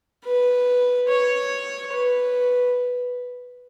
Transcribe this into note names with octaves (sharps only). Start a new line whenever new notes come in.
B4
C#5
B4